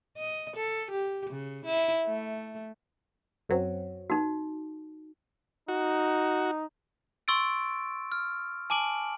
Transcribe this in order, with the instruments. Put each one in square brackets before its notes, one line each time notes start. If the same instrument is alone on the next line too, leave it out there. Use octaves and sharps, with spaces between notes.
[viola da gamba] D#5
A4
G4
C#3
E4
A3
[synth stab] F#2 F#3 C4
[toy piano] D#4 F#4
[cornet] D#4 [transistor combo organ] F#4
[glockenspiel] C6 C#6 E6 A6 D7
F6
G#5 A5 D6 D7 F#7